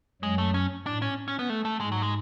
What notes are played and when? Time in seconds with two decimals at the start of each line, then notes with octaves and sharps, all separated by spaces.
0.22 F#2 F#3 G#3
0.38 A3
0.54 C#4
0.85 A2 D4
1.02 C#4
1.28 C#4
1.39 B3
1.50 A3
1.65 A3
1.80 G#2 G#3
1.92 F#3
2.02 G#3